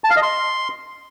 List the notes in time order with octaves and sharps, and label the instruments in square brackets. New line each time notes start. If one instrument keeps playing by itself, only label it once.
[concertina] A5
F5
D#5
C6